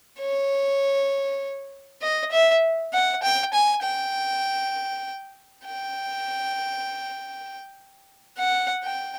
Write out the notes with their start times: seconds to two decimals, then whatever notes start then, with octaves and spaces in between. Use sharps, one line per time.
0.20 C#5
2.02 D#5
2.32 E5
2.93 F#5
3.23 G5
3.54 G#5
3.83 G5
5.66 G5
8.38 F#5
8.84 G5